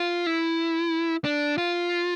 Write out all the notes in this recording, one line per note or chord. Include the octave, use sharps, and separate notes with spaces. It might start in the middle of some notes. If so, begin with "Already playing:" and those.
Already playing: F4
E4
D4
F4